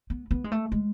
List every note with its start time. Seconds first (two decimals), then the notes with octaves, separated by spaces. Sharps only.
0.10 B3
0.31 B3
0.44 G#3
0.52 A3
0.72 G#3